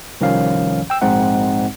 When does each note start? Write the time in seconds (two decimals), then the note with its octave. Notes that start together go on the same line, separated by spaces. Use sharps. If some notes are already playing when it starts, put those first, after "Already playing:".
0.21 C2 D#3 F3 C#4 C#5 F5
0.90 G5 E6
1.01 A#1 G#2 G#3 C4 D#4 F#5